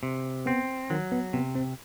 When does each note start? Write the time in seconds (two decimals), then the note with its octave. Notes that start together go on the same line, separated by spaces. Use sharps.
0.03 C3
0.46 B3 C4
0.90 D#3 F#3
1.12 B3
1.33 C3 B3
1.55 C4